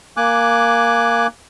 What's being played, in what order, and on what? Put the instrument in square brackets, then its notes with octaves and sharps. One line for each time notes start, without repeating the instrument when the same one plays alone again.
[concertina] A#3 G#5 D6 F#6